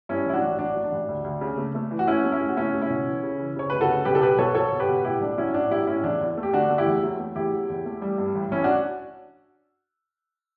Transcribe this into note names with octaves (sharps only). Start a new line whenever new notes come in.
G2 C#4 E4
A1 E4
D4 F#4
A1
A1 D4 F#4
F#3
D4
A1
D2
D2
C#3
A3
A3
E3
F#4
A3 C#4 E4
A3
C#4 E4
C#2
F#4
A3 C#4 E4
C#2
C#4 E4
B2
E3
C#3
E3
C#3 C#5
D2 B4
F#4 A4
C#3
B1 G4 B4
A4
B2 G4 B4
B1 A4 C#5
F#3 A4 C#5
B2
G4 B4
B2
A2 E4 G4
B1 D4
F#3 C#4 E4
A2 D4 F#4
F#3 E4 G4
A2 C#4 E4
E2 D4
E2
A3
G4
D3 D4 F#4
A3
E4 G4
E2
F#3
A3
E2 E4 G4
F#3
E2
A3
G3
G2
A1
A1 C#4 E4
D4 F#4